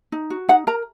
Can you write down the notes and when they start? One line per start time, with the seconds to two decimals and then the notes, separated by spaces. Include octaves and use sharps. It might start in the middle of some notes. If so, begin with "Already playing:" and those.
0.12 D#4
0.30 F#4
0.49 D#4 F#5
0.67 A#4 A#5